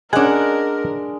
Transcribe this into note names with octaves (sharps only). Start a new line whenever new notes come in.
G#3 C#4 D4 A#4 F#5 G#5